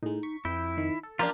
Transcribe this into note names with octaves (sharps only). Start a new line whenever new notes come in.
A2 G#3 D#4
C#6 B6
F2 E4 G5
D#3
A4
F3 A#3 D4 F4 G4 F5